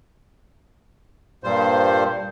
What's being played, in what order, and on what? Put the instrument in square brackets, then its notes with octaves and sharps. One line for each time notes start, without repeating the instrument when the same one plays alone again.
[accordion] G2 A#2 G3 C5